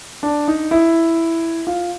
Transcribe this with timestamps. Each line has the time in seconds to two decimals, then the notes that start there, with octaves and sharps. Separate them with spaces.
0.23 D4
0.48 D#4
0.71 E4
1.67 F4